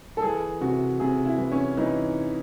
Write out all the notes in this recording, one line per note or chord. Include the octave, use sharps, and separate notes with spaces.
A4
E3 G#4
C3 F#4
C3 G#4
E4
E3
C#4
E3 D#4